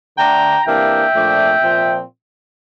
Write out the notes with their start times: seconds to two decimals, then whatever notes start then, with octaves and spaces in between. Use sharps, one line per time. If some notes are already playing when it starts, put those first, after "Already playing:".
0.17 D3 A3 D4 G5 A#5
0.65 C3 E3 A#3 D4 E5 G5
1.14 A#2 F3 A3 D4
1.62 A#2 F3 C4